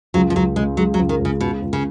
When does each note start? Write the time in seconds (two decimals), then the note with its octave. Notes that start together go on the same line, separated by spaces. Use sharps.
0.14 C#2 F#3
0.30 F3
0.35 C#2 F#3
0.56 C#3 G#3
0.77 F#3 G#3
0.94 F#3
0.99 C#2
1.09 D#3
1.20 C#2
1.25 C#3
1.41 C#2 B2
1.62 C#2
1.73 C#3